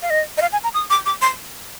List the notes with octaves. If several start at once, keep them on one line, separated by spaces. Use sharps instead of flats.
F5
D#5
D#5
F5
G#5
A#5
D#6
D6
D6
C6